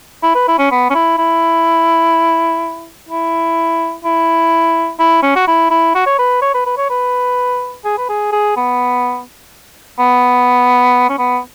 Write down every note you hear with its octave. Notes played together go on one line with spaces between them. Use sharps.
E4
B4
E4
C#4
B3
C#4
E4
E4
E4
E4
E4
C#4
F#4
E4
E4
F#4
C#5
B4
C#5
B4
B4
C#5
B4
G#4
B4
G#4
G#4
B3
B3
C#4
B3